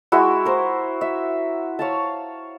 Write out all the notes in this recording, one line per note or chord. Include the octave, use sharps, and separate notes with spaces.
G#3 E4 F#4
A#4 C5
E5
C#5 F5 A5